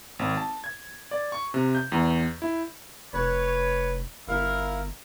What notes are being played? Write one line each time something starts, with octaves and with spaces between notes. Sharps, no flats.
G#1
A5
G#6
D5
C#6
C3
G6
E2
E4
F1 B4 C#5
G1 E4 A#4 F5